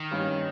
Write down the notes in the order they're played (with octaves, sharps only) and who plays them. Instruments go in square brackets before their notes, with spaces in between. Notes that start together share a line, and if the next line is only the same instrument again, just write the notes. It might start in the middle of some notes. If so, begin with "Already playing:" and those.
Already playing: [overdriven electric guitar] D#3
[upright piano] G2 G3 A#3 C#4